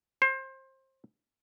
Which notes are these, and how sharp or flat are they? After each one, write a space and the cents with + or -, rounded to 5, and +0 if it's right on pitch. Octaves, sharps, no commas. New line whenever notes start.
C5 +25